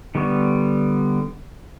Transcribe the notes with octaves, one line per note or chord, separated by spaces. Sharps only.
D3 G3 B3 C#6